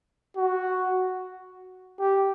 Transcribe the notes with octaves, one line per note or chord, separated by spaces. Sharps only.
F#4
G4